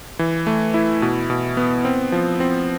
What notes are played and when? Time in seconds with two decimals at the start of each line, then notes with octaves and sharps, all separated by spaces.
0.19 E3
0.47 A3
0.74 E4
1.02 B2
1.30 B2
1.57 B3
1.85 C4
2.12 F3
2.40 C4